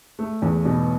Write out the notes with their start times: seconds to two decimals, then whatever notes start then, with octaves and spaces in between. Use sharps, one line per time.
0.19 A3
0.42 E2
0.65 B2